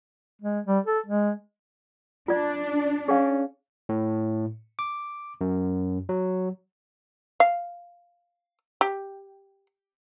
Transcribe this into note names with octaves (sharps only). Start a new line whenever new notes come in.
G#3
G3
A4
G#3
D4 F4 D5
C#4 G#4 F5
A2
D6
F#2
F#3
F5
G4